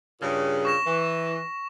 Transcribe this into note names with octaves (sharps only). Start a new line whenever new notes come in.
G2 A#2 C#3
C#6 A#6 E7
E3